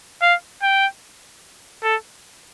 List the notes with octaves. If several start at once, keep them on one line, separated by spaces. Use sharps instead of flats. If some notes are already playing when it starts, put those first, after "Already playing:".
F5
G5
A4